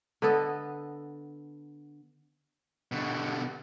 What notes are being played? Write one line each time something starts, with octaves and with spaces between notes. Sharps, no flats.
D3 B3 A4 D#5
B2 D3